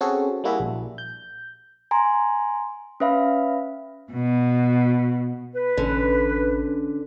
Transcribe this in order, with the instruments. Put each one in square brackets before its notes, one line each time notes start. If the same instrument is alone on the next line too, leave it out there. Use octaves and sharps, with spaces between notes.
[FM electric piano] C4 C#4 F#4 G#4 A4
G3 A#3 E4 F#4 G#4 E5
A#1
G6
[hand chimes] G#5 A#5 C6
C#4 B4 E5 F5 B5
[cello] B2
[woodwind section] B4
[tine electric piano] A1 C#4 [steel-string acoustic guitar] D3
[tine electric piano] C#4